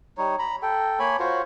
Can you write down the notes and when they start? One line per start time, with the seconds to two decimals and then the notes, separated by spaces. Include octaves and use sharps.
0.18 G3 D#4 C#5
0.39 A#5 B5
0.62 A4 G5
0.99 A#3 C#5 G#5 B5
1.20 F4 F#4 C5 C#5